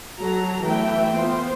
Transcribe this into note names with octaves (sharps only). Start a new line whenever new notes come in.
F#3 A4 A#5
E3 A3 B3 E5 G5
B3 F4 C5